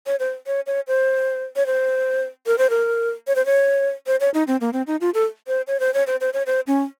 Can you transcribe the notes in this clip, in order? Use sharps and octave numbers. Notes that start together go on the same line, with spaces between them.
C#5
C5
C#5
C#5
C5
C#5
C5
A#4
C5
A#4
C#5
C5
C#5
C5
C#5
D#4
C4
A#3
C4
D#4
F4
A4
C5
C#5
C5
C#5
C5
C5
C#5
C5
C#4